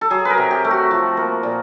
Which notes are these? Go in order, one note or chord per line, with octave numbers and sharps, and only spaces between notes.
A4
F#3 G#4
B4
A#4
C3
G4
A3
F#4
F3
A#3
A#2